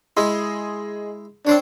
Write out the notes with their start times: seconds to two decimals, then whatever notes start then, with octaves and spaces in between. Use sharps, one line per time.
0.17 G#3 E4 G#4 D#5 C6
1.47 C4 D4 C5 C#5